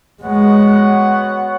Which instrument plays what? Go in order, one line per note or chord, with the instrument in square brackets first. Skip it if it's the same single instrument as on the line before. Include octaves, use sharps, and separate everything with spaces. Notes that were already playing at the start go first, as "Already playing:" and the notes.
[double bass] G#3 [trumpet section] B3 F#4 C#5 F#5